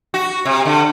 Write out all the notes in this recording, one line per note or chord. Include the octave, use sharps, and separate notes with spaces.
F#4
C3
D3